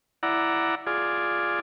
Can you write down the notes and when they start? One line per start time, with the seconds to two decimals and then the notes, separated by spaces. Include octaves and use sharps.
0.23 E4 D5 F#5 A#5
0.87 F4 G#4 D5